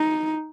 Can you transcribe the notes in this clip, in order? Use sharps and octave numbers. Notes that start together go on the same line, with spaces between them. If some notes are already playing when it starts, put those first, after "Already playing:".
Already playing: D#4